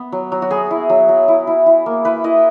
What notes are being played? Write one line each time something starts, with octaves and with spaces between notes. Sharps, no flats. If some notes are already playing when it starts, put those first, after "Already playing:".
Already playing: B3
F#3
F#3
F#4
B3 G#4
E4
F#3
F#3
E4
E4
E4
A#3
E4 B4
E4 D#5